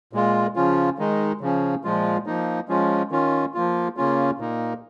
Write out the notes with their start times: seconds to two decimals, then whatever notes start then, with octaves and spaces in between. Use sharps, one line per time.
0.13 A#2 G#3 F4
0.56 C#3 F3 C#4 F4
0.98 D#3 G#3 D#4
1.41 C#3 F3 C#4
1.84 A#2 F3 G#3 F4
2.26 F3 A#3 D#4
2.69 F3 G#3 C#4 F4
3.11 D#3 C#4 F4
3.54 F3 A#3 F4
3.97 C#3 A#3 C#4 F4
4.39 A#2 A#3 D#4